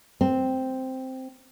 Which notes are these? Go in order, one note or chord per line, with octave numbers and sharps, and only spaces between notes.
C4